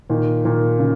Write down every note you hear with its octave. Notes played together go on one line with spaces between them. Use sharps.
A#2 D#3
A#2 D#3
C#3